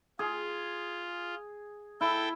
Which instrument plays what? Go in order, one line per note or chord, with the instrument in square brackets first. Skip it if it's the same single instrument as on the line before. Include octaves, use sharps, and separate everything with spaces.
[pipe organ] F4 [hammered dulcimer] G#4
[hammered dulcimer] E4 [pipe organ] A4 G5